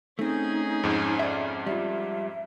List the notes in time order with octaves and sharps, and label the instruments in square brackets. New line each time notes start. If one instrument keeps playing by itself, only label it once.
[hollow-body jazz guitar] A3 C4 [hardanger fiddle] C#4 G#4 [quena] D#4
[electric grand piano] F2 G#2
[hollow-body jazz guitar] D5 E5
[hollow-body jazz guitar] G3 F4 [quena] E5